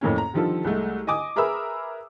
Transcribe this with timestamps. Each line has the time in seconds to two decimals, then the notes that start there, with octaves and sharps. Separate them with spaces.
0.01 F2 A2 A#3 C#4
0.18 A#5
0.33 D3 D#3 F3 G3 F4 A4
0.65 C2 G#3 A3
1.07 D#5 G#5 D6 D#6
1.36 G#4 A#4 B4 E5 B5 E6